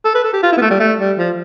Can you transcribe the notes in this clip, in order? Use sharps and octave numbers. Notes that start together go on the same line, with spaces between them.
A4
B4
A4
G4
F4
E4
B3
A3
G3
A3
G3
F3